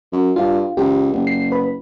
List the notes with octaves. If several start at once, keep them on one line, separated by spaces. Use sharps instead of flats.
F#2
G2 F4
C#2 G4
F#1
C7
B4 B5